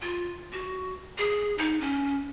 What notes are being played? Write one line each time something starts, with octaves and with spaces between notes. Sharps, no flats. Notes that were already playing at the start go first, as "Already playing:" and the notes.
F4
F#4
G#4
D#4
C#4